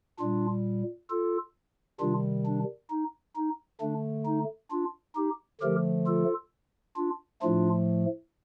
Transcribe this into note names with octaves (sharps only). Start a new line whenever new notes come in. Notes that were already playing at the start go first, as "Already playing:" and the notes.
A#2 G3 D4 F4
F4 A4
C3 D#3 G3 D4 F4
D4
D#4
D#4
D3 A3 D4
D#4
D4 F4
D#4 G4
D3 F3 A3 G4 A#4
F4 A4
D4 F4
A2 F3 A3 D4 F4